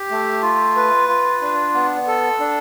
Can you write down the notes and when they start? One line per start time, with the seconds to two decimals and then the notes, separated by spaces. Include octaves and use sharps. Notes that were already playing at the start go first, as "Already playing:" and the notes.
Already playing: G4
0.11 A3
0.43 F4
0.76 B4
1.09 F4
1.42 D4
1.74 B3
2.07 A4
2.40 D4